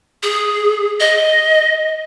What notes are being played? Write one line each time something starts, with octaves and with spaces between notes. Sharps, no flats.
G#4
D#5